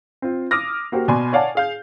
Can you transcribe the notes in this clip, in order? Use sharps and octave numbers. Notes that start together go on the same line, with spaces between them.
C4 F4
D6 D#6 F6 A#6
A#3 F#4 G4 C5
B2 D5 G#5 B5 C6
C#5 D5 F5 F#5 G#5 A5
G#4 F5 G6